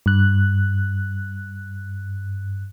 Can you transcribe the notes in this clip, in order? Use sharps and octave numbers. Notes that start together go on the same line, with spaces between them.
G2 F#6